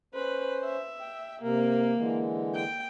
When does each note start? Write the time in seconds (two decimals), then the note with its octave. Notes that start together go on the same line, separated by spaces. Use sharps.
0.14 C#4 B4 C5
0.65 E5
1.01 G5
1.43 C3 A#3 A#4
1.97 D3 E3 G#3
2.55 G5